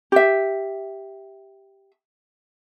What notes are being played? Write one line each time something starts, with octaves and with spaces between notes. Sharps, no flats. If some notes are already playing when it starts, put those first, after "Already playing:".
G4 E5